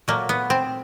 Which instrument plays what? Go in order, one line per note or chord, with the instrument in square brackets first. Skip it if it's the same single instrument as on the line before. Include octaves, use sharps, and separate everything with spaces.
[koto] A#2 F#3 A3 A#3
B3
C4